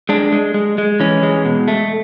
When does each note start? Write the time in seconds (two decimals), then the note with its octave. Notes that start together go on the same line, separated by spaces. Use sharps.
0.09 G#3 D4
0.32 G#3
0.54 G#3
0.78 G#3
1.00 E3 C#4
1.23 G#3
1.45 B2
1.68 A3